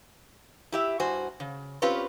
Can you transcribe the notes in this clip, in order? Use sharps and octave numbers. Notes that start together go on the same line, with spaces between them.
E4 G4 E5
G2 F#4 C5 G#5
C#3
C4 C#4 F4 G4 B4